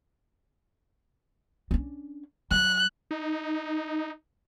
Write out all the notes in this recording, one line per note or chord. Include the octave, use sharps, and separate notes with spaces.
C#4 D4
F#3 F#6
D#4